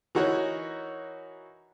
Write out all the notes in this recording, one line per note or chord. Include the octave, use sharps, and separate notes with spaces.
E3 D#4 F#4 A#4 C#5